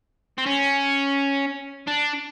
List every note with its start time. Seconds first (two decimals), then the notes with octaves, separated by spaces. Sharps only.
0.38 C4
0.46 C#4
1.87 D4